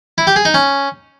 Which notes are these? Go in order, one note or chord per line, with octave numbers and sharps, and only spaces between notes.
E4
G4
G#4
D#4
C#4